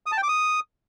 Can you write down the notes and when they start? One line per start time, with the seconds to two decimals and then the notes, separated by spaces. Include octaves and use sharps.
0.06 D#6
0.12 A5
0.17 G5
0.23 D6
0.28 D#6